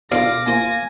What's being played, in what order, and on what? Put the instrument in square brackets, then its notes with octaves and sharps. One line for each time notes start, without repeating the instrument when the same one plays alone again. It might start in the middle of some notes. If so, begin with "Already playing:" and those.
[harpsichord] B2 D3 F4 [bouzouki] F5 [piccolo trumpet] D6 [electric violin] A#6
[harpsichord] A#3 F4 C5 [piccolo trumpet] G#5